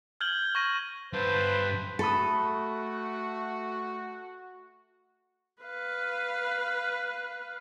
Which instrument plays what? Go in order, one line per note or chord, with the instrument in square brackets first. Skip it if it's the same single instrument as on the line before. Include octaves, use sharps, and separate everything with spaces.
[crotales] F6 G6 G#6 F#7 G7
C#6 G#6 A#6 D#7
[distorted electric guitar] G2 A4 [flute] B4 [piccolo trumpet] C5
[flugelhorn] A3 [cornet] F#4 [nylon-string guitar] A4 [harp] A5 B5 D#6
[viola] B4 F5